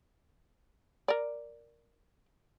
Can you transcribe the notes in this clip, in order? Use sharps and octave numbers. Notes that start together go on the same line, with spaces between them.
A#4 D5